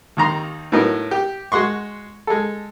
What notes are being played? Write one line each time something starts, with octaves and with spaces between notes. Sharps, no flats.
D#2 D#3 A#5 C6
A2 F#3 B3 D#4 A#4
G4
G#3 F#4 F#5 C6 C#6
G#3 A4